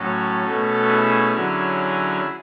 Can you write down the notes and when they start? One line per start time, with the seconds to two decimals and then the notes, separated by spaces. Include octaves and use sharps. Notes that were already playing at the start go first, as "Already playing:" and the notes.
Already playing: A2 F#3 C#4 F#4 A4
0.45 B2 A3 C#4
0.88 E4 G#4
1.32 D3 F#3 C#4